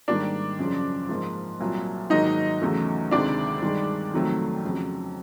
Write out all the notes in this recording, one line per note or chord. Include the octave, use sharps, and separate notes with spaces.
G#2 D#3 G3 A#3 D4 D5
F#2 C#3 F3
G#2 F3 A#3
C2 A#2 F#3 A#3
G#2 D#3 F#3 A#3 D#4 D#5
E2 C#3 F#3 A3
D2 C3 D#3 G#3 D4 D5
G2 D#3 G#3
F2 C3 D#3 F#3 A3
F2 C#3 F#3